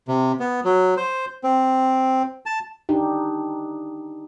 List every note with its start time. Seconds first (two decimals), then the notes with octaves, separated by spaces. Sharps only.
0.08 C3
0.40 B3
0.65 F#3
0.97 C5
1.44 C4
2.46 A5
2.89 D4 D#4 G4